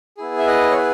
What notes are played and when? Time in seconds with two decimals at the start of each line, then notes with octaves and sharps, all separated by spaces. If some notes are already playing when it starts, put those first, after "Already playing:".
0.17 B3 E4 G#4
0.39 E5
0.47 B4 D#5
0.71 C#5
0.77 B4